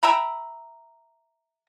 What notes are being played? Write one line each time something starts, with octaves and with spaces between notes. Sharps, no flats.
E5 G5 A#5 B5